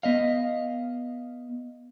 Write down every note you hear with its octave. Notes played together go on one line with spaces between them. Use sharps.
B3 D#5 F5